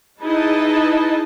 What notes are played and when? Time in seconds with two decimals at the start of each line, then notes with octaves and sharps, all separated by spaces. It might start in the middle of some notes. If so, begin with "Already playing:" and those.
0.21 D#4 E4 G#4 B4 D#5 A5